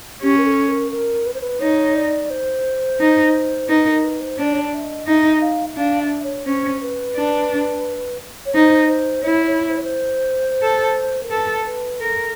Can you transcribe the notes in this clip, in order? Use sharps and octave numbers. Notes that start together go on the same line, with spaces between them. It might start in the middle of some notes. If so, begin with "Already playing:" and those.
C#4 G4
A#4
A4
A#4
A#4
B4
C5
B4
D#4 C#5
D5
C5
D#4
D#4 B4
A#4
B4
C5
D4 C#5
D5
C#5
D5
E5
D#5
D#4 E5
E5
F5
E5
D4 F5
E5
C#5
C#4 C5
B4
D4
C#5
D#4 C5
C5
E4 C#5
C#5
C5
C#5
C5
A4
A#4
A4 B4
B4
A4 A#4